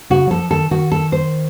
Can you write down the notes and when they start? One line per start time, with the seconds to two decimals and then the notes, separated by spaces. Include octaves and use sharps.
0.10 C#3 F#4
0.27 F#3
0.31 F3 A4
0.51 D#3 A4
0.71 D#3 F#4
0.92 A4
1.12 C5